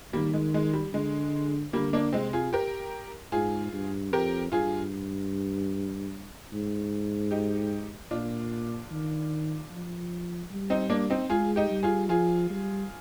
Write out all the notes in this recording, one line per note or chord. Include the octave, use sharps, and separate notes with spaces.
D#3 G3 A#3
G#3
G#3
G3
D3 G#3
D3 G3 A#3
A#3 D4
C3 G#3 C4
F4 G#4
G4 A#4
G#2 F4 G#4
G2
F2 G4 A#4
G2 F4 G#4
G#2
D#4 G4
A#2 D4 F4
D#3
F3
G3
C4 D#4
A#3 D4
C4 D#4
G#3 F4 G#4
D#4 G4
G3
F4 G#4
F3 F4 G#4
G3